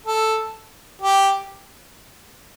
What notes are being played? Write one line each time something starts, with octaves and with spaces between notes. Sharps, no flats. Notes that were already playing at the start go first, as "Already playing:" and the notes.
A4
G4